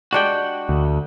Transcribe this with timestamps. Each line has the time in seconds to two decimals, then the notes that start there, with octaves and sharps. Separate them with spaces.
0.13 G#3 D4 F#4 G4 F#5 G5
0.69 D2